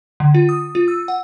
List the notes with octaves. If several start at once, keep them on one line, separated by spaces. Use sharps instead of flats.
D3
F4
D#6
F4
E6
F#5